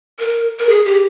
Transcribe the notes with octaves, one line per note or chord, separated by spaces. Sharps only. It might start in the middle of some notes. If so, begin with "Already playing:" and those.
A#4
A#4
G#4
G4